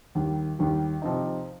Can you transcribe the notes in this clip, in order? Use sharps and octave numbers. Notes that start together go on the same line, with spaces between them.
D#2 D#3 G3
D#2 D#3 G3
C3 F3 C4 D#4